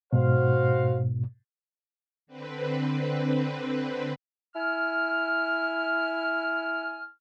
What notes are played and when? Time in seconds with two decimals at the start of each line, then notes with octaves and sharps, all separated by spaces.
0.13 G#2 B2 F#4 C5 F5
2.27 D3 C4 B4
4.55 E4 G#5 F6